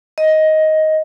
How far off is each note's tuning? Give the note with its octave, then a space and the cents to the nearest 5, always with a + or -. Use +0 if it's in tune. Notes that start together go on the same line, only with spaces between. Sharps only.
D#5 +10